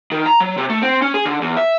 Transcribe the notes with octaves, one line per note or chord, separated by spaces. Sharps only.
D#3
A#5
F#3
C3
A3
C4
C#4
G#4
D3
E2
E5